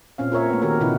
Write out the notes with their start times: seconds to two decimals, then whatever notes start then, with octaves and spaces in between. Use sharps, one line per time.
0.18 A#2 C4 C#4 F5
0.32 F4 A#4 C#5 E5
0.50 A3 B3
0.62 D#3 F#4 G4 A#4
0.81 A#2 C#3 B3 D#4 E4 B4